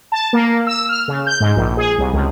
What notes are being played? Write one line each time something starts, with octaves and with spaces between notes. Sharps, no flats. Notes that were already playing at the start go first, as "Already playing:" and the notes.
A5
A#3
E6
F6
C#3
G6
G#2
A#1
G#4
C2
C#2